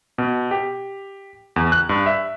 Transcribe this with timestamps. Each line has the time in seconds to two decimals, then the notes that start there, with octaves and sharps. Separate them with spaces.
0.18 B2
0.51 G4
1.56 E2
1.72 F#6
1.89 G2
2.06 E5